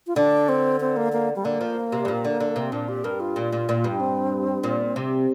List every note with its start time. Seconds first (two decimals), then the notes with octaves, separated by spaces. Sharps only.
0.07 F4
0.16 D3 D4
0.49 C4
0.81 C4
0.97 A#3
1.13 A#3
1.36 G3
1.45 D3 A#3
1.61 F3
1.92 C3
2.05 G2
2.08 A#2
2.24 D3
2.40 D3
2.56 C3
2.72 A#2 D4
2.88 G4
3.04 G2 A#4
3.20 F4
3.36 A#2
3.52 A#2
3.69 A#2
3.84 G2
4.00 C4
4.63 A#2
4.96 C3